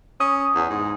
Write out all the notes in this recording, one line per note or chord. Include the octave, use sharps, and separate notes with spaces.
C#4 D#6
E2
G#2